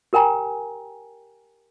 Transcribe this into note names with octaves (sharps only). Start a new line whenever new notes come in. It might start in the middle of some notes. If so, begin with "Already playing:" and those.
G4 A#4 G5 G#5 A#5